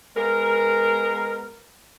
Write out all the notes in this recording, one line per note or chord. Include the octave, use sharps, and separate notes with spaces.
G#3 B3 A#4